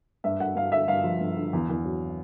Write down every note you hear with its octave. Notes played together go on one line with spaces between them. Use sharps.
G2 E5
G2 F#5
G2 F5
D3 E5
G2 F5
F3
G2
D3
E2
E2
F#3